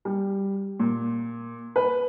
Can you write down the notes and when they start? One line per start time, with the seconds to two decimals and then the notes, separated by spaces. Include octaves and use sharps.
0.05 G3
0.80 A#2
1.76 B4